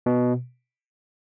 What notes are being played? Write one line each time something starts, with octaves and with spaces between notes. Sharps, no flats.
B2